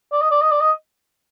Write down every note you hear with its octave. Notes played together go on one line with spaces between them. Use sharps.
D5
D#5
D5
D#5
D5
D#5